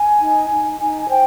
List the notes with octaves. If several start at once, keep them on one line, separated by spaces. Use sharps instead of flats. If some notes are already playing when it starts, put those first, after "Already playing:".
Already playing: G#5
D#4
D#4
D#4 G#5
G#5
C5 G5